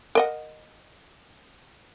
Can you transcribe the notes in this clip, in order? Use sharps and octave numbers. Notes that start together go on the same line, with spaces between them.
A#4 D#5 F#5